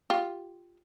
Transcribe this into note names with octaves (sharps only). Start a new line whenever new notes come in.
F4 G4